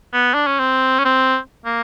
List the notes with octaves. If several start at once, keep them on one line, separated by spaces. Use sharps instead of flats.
B3
D4
C#4
C4
C#4
C4
A#3